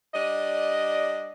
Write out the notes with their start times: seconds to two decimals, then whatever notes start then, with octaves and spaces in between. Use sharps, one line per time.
0.14 G3 D4 D#5